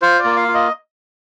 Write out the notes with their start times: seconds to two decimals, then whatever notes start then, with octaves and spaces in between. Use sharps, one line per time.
0.02 F4 C5
0.19 D5
0.25 A#3
0.36 F5
0.48 F4
0.54 D#5